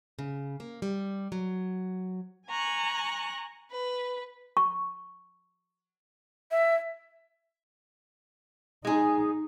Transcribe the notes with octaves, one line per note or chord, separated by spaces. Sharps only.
C#3
A#3
G3
F#3
G#5 A#5 C#6 F#6
B4
C#6
E5
G#3 D#4 G#4